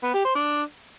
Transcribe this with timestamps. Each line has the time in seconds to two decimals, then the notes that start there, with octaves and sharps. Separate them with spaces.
0.03 B3
0.14 G4
0.25 C5
0.35 D4